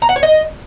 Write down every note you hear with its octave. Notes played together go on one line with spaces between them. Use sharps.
A#5
F#5
C#5
D#5